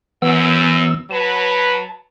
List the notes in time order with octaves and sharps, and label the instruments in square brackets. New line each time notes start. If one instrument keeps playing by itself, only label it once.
[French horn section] F#2 [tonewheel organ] E3 B3 E6
[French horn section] F#3 B4 [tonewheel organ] A5